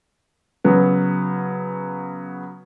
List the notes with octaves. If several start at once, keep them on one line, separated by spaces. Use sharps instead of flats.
C#3 F#3 B3